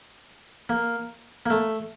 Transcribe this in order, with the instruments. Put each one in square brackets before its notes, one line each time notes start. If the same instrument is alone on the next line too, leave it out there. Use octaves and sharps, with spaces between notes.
[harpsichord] A#3
A#3
A3